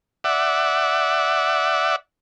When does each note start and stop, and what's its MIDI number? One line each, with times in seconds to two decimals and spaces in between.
0.24 1.96 74
0.24 1.96 76
0.24 1.96 78